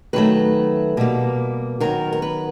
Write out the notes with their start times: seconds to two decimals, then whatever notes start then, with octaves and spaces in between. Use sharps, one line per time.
0.13 D#3 F#3 A3 B4
0.97 B2 G3 A#3
1.80 D#3 F#3 B3 A#4
2.13 A#4
2.22 B4